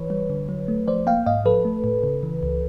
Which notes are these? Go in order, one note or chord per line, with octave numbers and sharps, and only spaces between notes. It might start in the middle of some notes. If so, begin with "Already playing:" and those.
Already playing: E3 B4 C#5
G3
D3
F#3
A3
F3 C5 D5
A#3 F5 G5
G#2 D#5 F5
F3 A4 B4
A3
A2
C#3
E3
C#2